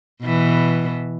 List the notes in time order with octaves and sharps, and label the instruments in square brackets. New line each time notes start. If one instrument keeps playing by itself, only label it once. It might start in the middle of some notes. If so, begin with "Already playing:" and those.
[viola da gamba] B2 E3